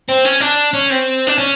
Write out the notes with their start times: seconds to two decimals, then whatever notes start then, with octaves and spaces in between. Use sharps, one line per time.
0.09 C4
0.25 C#4
0.41 D4
0.73 C#4
0.90 C4
1.27 D4
1.38 C#4